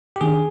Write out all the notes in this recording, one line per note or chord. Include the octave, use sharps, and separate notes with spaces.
G4
D#3 B3 D4 G#4